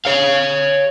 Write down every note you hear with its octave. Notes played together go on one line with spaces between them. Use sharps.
C#5 F5